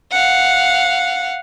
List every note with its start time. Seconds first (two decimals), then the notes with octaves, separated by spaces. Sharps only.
0.11 F5 F#5